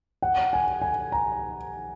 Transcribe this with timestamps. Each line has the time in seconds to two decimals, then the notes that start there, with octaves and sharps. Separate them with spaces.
0.22 F#5
0.53 G#5
0.82 G#5
1.12 A#5